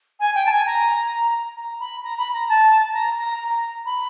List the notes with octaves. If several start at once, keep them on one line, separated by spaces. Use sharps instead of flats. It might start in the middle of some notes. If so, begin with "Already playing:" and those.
G#5
G5
A5
G#5
A#5
A#5
B5
A#5
B5
A#5
A5
A#5
A#5
A#5
B5